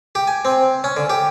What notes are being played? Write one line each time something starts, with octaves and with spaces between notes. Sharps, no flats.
G4
G#5
C4
C#4
D3
G4